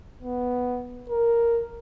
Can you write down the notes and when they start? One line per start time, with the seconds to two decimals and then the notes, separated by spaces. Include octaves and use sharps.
0.23 B3
1.10 A#4